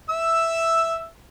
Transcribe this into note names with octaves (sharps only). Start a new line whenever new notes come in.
E5 E6